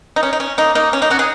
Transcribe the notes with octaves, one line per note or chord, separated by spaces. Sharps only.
D#4
C#4
D#4
C#4
A#3 D#4
A#3 D#4
C#4
A#3 D#4
C#4 F#4
D#4 G#4